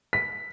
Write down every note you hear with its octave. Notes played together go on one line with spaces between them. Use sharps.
B6